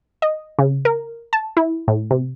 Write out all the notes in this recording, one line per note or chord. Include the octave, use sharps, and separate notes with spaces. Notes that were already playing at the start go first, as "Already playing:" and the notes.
D#5
C#3
A#4
A5
E4
A2
C3